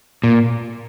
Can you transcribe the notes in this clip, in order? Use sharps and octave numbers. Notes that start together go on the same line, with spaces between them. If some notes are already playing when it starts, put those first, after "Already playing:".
A#2